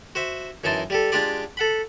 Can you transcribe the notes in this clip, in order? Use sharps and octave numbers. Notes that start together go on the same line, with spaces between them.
F#4 C5 E5
F#2 E3 D#4 A5 C6
G3 G4 A4
G#3 D4 F4 G4 D5
A4 F#5 B5